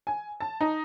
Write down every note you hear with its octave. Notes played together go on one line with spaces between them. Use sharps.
G#5
A5
D#4